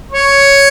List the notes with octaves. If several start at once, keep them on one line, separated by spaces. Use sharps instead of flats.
C#5